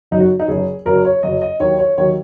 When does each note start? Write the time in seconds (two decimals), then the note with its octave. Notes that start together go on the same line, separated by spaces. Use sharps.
0.11 F#1 F#2 F#3 D#4
0.20 F#4
0.40 D#4
0.48 F#1 F#2 F#3 G#4
0.86 F#1 F#2 F#3 A#4
1.05 C#5
1.23 F#1 F#2 F#3 D#5
1.42 D#5
1.60 D#2 D#3 F#3 C#5
1.79 C#5
1.98 D#2 D#3 F#3 C#5